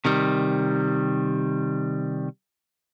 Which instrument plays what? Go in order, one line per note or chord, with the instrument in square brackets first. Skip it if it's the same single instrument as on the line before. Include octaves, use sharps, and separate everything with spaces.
[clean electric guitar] C3 D#3 G3